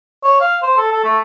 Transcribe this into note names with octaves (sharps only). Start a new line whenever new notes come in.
C#5
F5
C5
A4
A4
A3